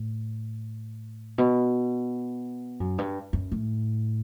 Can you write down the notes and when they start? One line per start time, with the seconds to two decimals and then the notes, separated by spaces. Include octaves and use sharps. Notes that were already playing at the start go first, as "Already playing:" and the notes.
Already playing: A2
1.38 B2
2.80 F#2
2.98 G2
3.33 F#2
3.52 A2